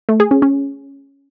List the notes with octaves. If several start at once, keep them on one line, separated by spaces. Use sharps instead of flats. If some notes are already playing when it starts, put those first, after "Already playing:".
A3
G#4
C#4
C#4